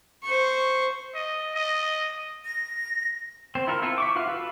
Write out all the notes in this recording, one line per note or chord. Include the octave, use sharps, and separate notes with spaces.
C5 C#6
D#5
D#5
A#6
C4 C5
E4 F4 A4 A#4
C4 E4 F4 A4
E5 C#6 D6
F4 F#4 B4 F5
F4 F#4 A4 B4 E5